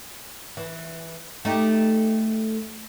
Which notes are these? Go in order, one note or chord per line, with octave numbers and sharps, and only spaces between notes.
E3
A3 D#4 G4